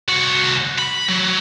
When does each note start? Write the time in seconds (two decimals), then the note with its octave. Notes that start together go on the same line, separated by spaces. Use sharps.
0.09 C2 F#4
0.79 B5
1.09 F#3